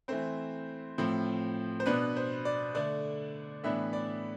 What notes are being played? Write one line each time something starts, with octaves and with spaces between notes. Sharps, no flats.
E3 A3 C4 C5
A2 F3 C4
C5
B2 B3 D4 B4
C5
D5
D3 A3 D4 D5
A2 E3 B3 D4 E5
D5